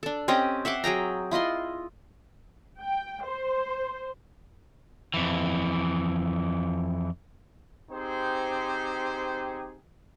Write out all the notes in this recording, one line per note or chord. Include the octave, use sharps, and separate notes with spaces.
D4 A4
C4 C#4 G4 D#5
E5 F#5 C6 D6
F#3 G#4 G5 A#5
E4 F4 D#5 C6
G5
C5
F2 E3
C4 D#4 G4 G#4 C5